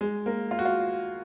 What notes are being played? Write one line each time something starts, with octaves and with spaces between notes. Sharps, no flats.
G#3
A#3
F4
F#4
F4